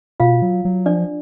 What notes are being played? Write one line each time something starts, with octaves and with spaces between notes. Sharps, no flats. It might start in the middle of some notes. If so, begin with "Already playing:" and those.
B2 F4 F5
F#3
F#3
F3 D4 D5